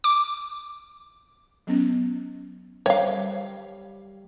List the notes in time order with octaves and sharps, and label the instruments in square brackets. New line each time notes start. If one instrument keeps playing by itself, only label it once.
[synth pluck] D6
[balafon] F#3 B3 C#4
[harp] G3 [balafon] C5 E5 G5 [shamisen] C#5 F5